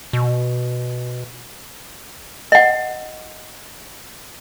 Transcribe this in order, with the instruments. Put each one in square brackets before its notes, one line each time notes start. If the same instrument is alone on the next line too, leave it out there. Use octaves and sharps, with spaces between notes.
[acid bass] B2
[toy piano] D#5 F#5